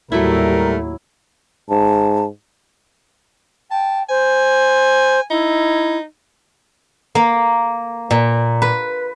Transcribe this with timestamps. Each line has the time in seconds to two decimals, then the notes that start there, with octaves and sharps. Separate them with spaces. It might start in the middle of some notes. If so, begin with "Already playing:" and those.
0.12 D#2 A2 F#3 G3 A3 E4 A#4
1.69 G#2 A5
3.71 G5 A5
4.09 C5 G#5
5.31 D#4 E4
7.15 A#3
8.11 A#2
8.62 B4